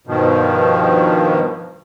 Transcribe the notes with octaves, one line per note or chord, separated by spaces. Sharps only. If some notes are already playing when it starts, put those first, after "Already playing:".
G2 B2 D#3 F3